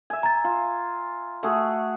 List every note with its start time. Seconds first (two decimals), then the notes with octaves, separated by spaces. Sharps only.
0.10 E5 G#5
0.23 A#5 A6
0.44 F4
1.43 A3 F#4 G#4